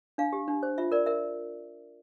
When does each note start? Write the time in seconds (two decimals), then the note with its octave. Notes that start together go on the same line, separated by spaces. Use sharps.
0.18 D4 F5
0.33 G4
0.48 D4
0.63 C5
0.78 F4 E5
0.92 A#4 D5
1.06 A#4 E5